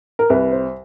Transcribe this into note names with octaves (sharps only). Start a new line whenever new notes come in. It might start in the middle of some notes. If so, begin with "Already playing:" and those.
A#4
C2 B4
C5